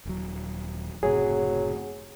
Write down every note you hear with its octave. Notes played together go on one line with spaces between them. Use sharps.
D#1 F#3
F#1 A2 C3 F#3 G#4